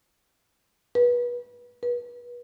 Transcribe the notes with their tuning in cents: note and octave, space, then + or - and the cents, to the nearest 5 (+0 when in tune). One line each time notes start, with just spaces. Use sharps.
B4 -30
B4 -35